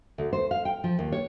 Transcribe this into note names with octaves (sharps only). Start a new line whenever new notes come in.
D2
C5
F5
G5
F3
D#2
C#5